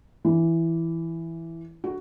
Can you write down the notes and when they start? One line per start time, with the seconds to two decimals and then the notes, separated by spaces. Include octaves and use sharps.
0.25 E3
1.84 F#4